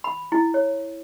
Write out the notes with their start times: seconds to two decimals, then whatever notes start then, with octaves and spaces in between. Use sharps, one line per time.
0.04 B5
0.32 E4
0.54 C#5